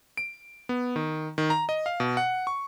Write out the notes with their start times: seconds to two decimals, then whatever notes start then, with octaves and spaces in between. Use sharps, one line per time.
0.17 D7
0.69 B3
0.96 D#3
1.38 D#3
1.50 A#5
1.69 D#5
1.86 F5
2.00 B2
2.17 F#5
2.47 C#6